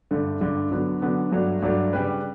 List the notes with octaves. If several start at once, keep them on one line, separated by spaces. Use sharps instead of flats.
G2 D3 A3
G2 D3 A3
D3 F#3 B3
D3 F#3 B3
G2 F#3 A3 D4
G2 F#3 A3 D4
C#3 G3 D4 G4 B4